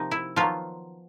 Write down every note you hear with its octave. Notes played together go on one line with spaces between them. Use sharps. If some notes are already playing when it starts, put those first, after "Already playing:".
Already playing: C3 F3 A#3 D#4
E4
D#3 F3 F#3 B3 F4